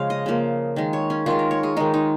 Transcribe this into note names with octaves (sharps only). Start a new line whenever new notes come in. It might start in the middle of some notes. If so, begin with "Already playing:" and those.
Already playing: C#3 F3 G#3 F5
D#5
C#3 F3 A#3
D#3 G#3
C#5
C#4
D#3 G#3 F4
A#4
C#5
G#4
D#3 G#3 D#4
D#4